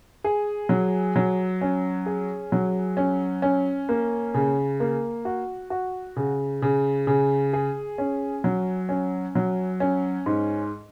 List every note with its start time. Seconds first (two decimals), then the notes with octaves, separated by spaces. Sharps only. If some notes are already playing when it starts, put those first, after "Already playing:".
0.24 G#4
0.69 F#3
1.16 F#3
1.61 C#4
2.06 G#4
2.52 F#3
2.97 C#4
3.42 C#4
3.89 A#3
4.34 C#3
4.80 A#3
5.25 F#4
5.70 F#4
6.16 C#3
6.62 C#3
7.07 C#3
7.53 G#4
7.98 C#4
8.44 F#3
8.89 C#4
9.35 F#3
9.80 C#4
10.26 G#2